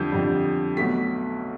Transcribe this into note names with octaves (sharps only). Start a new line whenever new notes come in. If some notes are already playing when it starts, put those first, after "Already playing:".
Already playing: F2 D3 G3 G6
F2 D3 G3
B1 B2 A3 B6